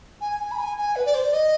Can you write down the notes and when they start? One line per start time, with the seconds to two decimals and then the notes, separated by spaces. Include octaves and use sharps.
0.20 G#5
0.39 G#5
0.51 B5
0.58 G#5
0.77 G#5
0.95 B4
1.05 D5
1.14 C5
1.24 D5
1.33 D#5